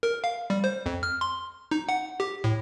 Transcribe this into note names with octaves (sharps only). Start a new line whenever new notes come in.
A#4
F5
G3
C5
F2
F6
C6
D#4
F#5
G4
A2